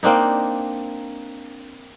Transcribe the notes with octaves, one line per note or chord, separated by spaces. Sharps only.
A#3 C4 D4 D#4